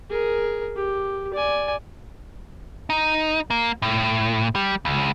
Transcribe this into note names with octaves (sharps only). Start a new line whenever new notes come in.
G#4 A#4
G4
D5 G#5
D#4
A#3
A2
G3
C#2